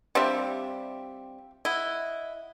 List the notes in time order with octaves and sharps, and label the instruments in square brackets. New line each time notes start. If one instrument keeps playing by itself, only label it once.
[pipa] G3 C4 D4 [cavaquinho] F4 G4 E5
[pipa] E4 [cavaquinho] D#5 F#5